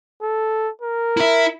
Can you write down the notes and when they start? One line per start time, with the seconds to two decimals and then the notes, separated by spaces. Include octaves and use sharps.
0.22 A4
0.82 A#4
1.17 E4 E5